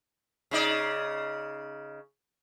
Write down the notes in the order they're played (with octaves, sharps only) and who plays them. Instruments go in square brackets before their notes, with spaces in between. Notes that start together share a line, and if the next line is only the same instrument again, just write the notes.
[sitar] C#3 D#4 D5